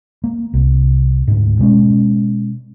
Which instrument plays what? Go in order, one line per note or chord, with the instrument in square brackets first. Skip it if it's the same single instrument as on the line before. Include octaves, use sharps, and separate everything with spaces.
[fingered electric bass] A#3
C2
D2 G#2
B2 G#3 A3 C#4